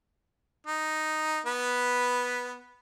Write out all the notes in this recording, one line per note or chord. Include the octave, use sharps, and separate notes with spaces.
D#4
B3 B4